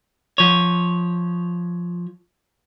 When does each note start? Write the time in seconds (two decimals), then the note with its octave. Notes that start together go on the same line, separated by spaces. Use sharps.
0.38 F3 C#5